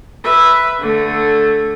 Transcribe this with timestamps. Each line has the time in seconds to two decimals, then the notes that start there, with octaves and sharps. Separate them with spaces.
0.24 B4 E5
0.80 D3 A3